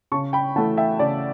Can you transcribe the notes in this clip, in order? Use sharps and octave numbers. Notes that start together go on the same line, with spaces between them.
C#3 A5 C#6
G5 B5
E3 A3 F#5 A5
E5 G5
C#3 D5